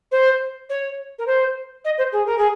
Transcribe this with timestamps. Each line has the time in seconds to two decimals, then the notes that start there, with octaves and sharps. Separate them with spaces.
0.11 C5
0.69 C#5
1.19 A#4
1.26 C5
1.85 D#5
1.98 C5
2.12 G#4
2.26 A#4
2.38 G#4